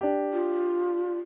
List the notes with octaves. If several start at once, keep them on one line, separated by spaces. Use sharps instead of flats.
D4 G4
F4